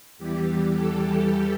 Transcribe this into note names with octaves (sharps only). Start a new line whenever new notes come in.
E2 E3 G3 G4
A4